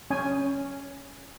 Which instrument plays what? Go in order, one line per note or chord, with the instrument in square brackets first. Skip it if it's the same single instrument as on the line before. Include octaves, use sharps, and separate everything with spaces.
[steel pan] C#4 G#5